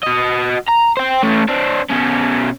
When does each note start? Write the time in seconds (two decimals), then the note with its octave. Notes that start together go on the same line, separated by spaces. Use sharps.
0.03 F#4 D#5
0.68 A#5
0.97 C5 G5
1.23 A3 C#4
1.49 C4 D4
1.90 B2 C#4